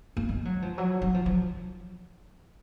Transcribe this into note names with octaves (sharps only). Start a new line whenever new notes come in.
A#3
G#3
F#3
F3
F#3
F#3
F3
F#3